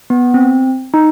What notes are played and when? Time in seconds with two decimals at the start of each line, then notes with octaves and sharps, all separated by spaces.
0.10 B3
0.34 C4
0.94 D#4